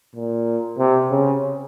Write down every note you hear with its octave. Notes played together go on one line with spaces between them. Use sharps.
A#2
C3
C#3